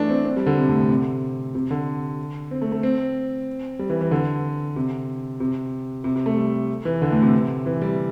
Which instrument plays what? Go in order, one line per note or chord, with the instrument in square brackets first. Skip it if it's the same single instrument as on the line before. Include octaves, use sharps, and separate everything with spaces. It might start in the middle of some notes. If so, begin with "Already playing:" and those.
Already playing: [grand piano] E3 A3 D4
C4
C4
G3
D3
C3
A2
A2
C3
C3
D3
C4
A3
A3
C4
G3
E3
E3
D3
C3
C3
C3
C3
A3
G3
E3
D3
A2
C3
E3
G3